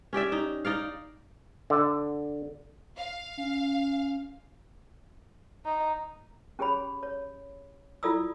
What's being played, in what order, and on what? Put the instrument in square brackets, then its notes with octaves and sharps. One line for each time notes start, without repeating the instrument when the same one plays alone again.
[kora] C#4 G4 D5 E5
D#4
D#4 D5 F5
[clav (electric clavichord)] D3
[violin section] F5
[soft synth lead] C#4
[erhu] D#4
[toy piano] C#4 G4 G#4 C#5 B5
C#5
E4 F4 A4 D5 D#6 E6